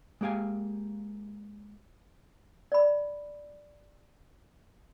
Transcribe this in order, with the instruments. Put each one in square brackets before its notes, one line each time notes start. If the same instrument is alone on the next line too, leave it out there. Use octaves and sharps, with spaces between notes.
[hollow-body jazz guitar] G#3 A#3 G4 F5 G#5
[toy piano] D5 B5